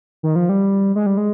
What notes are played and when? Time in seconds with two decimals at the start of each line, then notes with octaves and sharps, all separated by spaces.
0.23 D#3
0.36 F3
0.49 G3
0.96 G#3
1.06 G3
1.17 G#3